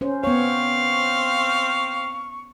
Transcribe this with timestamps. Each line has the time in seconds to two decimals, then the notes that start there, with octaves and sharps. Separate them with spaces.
0.01 C#4 C5
0.24 B3 C4 C#5 F5 C#6